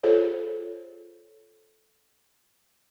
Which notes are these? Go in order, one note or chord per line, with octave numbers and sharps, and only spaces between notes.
F4 G#4 A4 C5 C#5